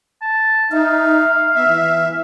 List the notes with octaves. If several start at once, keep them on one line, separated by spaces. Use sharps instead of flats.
A5
D#4 E5 F5
B3 E5
E3